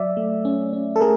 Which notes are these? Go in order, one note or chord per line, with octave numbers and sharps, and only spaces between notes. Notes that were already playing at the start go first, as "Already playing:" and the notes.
Already playing: F#3 D5 E5
A3
C#4
C#4
A4
A3 G#4 A#4